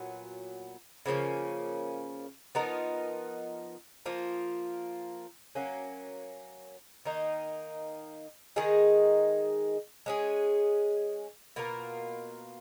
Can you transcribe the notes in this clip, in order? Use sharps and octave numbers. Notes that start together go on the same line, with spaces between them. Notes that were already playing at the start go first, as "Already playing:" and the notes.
Already playing: A#2 F#3 B3
C#3 F3 A#3 C#4
F3 B3 D#4 A#4
F3 A#3 F4
F#3 A#3 C#4
D#3 A#3 D#4
D#3 G#3 D#4 G#4
G#3 C#4 G#4
B2 A#3 F4 A#4